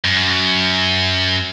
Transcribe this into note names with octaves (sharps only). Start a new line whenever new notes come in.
F#2